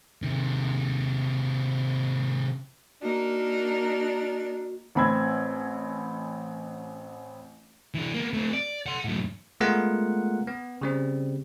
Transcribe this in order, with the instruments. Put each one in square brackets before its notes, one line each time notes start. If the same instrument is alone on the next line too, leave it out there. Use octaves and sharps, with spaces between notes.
[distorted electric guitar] C3 D#3
[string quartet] A#3 D#4 A#4 [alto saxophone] D4 [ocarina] F#4
[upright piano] A1 C4 B5 E6 G#6
[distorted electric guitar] E3 D4
A#3 B3
A3 C4
D5
F#5 C6
F#2 A2
[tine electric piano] G#3 A3 B3 F4 A#4 F#5
B3
C#3 G3 C4